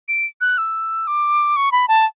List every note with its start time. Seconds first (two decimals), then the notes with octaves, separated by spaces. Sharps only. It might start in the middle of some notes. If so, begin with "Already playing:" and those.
0.08 D7
0.41 F#6
0.58 E6
1.07 D6
1.56 C#6
1.72 B5
1.88 A5